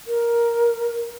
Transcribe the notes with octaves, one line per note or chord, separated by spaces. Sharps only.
A#4